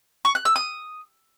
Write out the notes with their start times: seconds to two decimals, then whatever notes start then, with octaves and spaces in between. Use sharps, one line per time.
0.25 C#6
0.35 F#6
0.45 E6
0.56 D#6